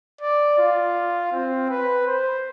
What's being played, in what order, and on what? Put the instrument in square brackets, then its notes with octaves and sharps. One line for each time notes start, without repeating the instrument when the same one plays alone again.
[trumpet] D5
F4
C4
B4
C5